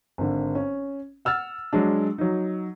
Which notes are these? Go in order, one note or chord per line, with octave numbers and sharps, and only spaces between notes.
G#1 D3
C#4
F#5 E6 F6 A6
F#3 G#3 D4
F#3 D#4